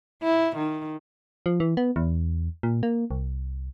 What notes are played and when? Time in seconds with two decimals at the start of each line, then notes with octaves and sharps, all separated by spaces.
0.23 E4
0.56 D#3
1.46 F3
1.60 E3
1.77 B3
1.96 E2
2.63 A#2
2.83 A#3
3.11 C2